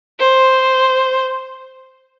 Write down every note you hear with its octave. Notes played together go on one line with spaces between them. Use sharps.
C5